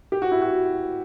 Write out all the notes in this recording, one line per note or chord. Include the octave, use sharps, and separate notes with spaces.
G4
F#4
E4
F#4